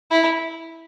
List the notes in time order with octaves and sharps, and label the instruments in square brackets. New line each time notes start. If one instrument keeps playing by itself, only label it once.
[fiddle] E4